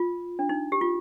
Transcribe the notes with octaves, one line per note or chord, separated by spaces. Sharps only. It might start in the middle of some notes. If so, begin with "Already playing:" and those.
Already playing: F4
D4
D#4
G4
F4